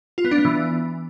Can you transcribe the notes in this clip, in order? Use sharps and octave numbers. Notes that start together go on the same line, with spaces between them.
F4
B3
D4
B3
E3